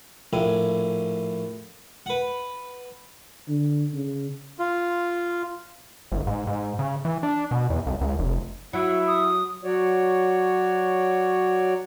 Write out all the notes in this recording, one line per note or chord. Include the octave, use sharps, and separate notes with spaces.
A#1 A2 G#5
B4 F#5
D3
C#3
F4
G1
G#2
G#2
C#3
E3
D4
B2
E2
C2
C#2
F1
F#3 E4
D#6
F#3 F#4 C#5 D5